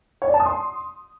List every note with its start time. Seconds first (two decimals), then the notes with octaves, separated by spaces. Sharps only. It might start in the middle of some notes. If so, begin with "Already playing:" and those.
0.22 C#5
0.28 D5
0.34 A5
0.40 D#6
0.46 C6